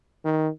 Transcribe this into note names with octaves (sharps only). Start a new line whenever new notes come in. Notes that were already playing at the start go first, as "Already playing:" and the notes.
D#3